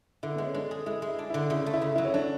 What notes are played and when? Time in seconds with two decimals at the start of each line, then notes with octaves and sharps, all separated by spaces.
0.23 D3 E4
0.35 G#3 B3
0.45 C#4
0.54 G#3 D4
0.71 G#4
0.86 G#3 E4
1.02 G#3
1.08 E4
1.19 D4
1.30 D3 E4
1.50 C#3 E4
1.66 A3
1.74 E4
1.81 C#3
1.96 F#3 E4
2.05 C#4
2.14 F#3 D4